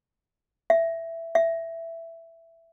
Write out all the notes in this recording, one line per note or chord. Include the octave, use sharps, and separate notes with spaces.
E5
E5